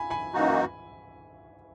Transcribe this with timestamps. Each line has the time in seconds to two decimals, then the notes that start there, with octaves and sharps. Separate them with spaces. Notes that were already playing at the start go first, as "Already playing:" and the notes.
Already playing: G#5 B5
0.10 G#5 B5
0.33 F#2 E3 A#3 D#4 F#4